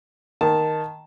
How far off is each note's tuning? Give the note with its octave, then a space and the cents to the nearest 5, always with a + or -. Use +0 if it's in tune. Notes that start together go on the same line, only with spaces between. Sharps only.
D#3 +0 A5 +0